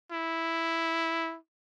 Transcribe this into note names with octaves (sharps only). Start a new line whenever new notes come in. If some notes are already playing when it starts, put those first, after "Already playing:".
E4